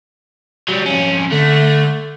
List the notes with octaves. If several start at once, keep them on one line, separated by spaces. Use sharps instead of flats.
F#3 G3
F2 C#4
D3 A3